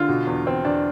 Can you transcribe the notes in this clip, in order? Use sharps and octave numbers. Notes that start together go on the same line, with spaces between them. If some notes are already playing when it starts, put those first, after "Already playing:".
Already playing: D3 F4
B2
E2
E2 C4
E2 D4